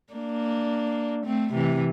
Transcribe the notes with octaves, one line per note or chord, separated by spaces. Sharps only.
A#3 D4
A3 C4
C3 E3